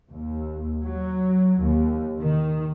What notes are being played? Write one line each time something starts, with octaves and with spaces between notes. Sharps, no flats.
D#2
F#3
D#2
D#3